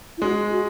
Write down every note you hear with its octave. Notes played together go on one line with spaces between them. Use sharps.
E4
G#3 F#4
F#4